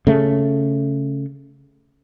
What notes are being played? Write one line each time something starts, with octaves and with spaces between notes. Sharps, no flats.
C#3 A3